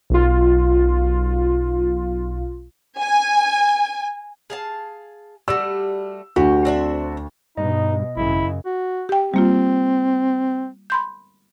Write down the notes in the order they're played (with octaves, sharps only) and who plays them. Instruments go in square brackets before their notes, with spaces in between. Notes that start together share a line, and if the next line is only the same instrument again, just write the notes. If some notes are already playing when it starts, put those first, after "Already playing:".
[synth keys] B1 F4
[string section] G#5
[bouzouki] G#4 F5 A5
[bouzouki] G3 A3 F#4 [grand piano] E6
[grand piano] D2 [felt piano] F#4 [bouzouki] G4
[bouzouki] C4 D4 E5
[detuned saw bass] G2 [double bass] B2 [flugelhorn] D#4 [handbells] D#5
[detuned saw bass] G#1 [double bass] F#2 C#3 [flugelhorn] E4
[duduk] F#4
[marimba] G4 G5
[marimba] G3 A#3 F4 [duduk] C4
[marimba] B5 C6 G6